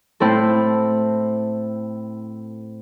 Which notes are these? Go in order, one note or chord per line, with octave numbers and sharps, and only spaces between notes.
A2 C4 E4 A4